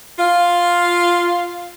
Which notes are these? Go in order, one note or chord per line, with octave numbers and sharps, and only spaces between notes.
F4 F5